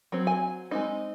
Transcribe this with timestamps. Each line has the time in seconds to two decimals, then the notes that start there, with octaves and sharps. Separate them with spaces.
0.12 F#3 C4
0.27 G#5
0.71 G#3 C4 D#4